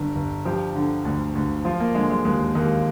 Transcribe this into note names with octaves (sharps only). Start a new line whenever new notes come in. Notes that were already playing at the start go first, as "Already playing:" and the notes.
Already playing: G1 G2
G1
F3 G4
D3
D2
D2
F3 F4
A#3
D3 G#3
G#3
D#2 G#3
D#2 A#3